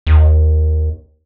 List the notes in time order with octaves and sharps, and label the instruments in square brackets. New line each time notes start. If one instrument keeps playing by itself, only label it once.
[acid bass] D#2